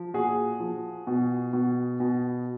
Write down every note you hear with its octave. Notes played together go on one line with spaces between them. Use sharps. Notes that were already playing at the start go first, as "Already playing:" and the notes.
Already playing: F3
A#2 F#4 G#4
F3
B2
B2
B2